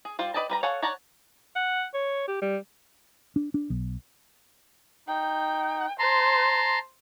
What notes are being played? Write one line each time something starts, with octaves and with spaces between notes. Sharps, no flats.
G#4
G3 F4 C5
B4 D5 D#5 G5 A5
G3 B4 A#5
A4 C#5 F5 F#5 G#5
C#5 D5 F#5 A5 A#5
F#5
C#5
G4
G3
D4
D4
B1
D#4 G5
C5 A5 A#5 C6